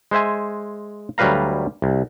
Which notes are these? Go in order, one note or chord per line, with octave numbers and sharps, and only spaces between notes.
G#3 C5 E5 G#5
D2 F#3 G3 B4 F5 A#5
C2